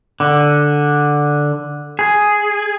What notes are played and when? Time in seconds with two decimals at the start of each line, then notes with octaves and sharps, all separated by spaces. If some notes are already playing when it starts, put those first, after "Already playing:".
0.20 D3
1.99 G#4